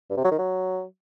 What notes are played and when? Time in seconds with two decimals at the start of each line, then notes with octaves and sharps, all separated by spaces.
0.10 G2
0.17 C3
0.24 F#3
0.31 D#3
0.39 F#3